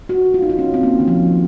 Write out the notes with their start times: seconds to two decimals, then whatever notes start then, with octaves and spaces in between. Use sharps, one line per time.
0.09 F#4
0.34 F4
0.42 D#4
0.50 F4
0.59 C#4
0.74 C4
0.83 A#3
1.00 D#3
1.08 F3